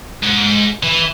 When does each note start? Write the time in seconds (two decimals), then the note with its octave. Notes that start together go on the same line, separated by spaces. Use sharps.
0.23 G#2
0.83 E3